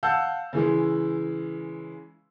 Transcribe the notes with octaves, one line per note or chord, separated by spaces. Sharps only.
F5 F#5 A5 E6 G6
C#3 E3 G#3